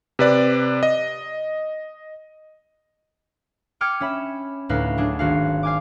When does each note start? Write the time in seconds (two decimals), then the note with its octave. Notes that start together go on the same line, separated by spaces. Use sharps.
0.19 C3 B4 D5
0.83 D#5
3.81 G5 D6 F6 G#6 C#7 D#7
4.00 C#4 E5 B5
4.69 D2 A2 D#4 B4 F5
4.97 F#3 D4 G#4
5.19 G#1 F#4 F5
5.63 F5 G#5 D6